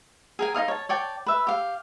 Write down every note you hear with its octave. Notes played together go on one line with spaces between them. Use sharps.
G#4 A#4 G#5
D#4 C#5 F5 D#6
C#5 A5
C#5 D5 G5 A5
B4 E5
G4 F5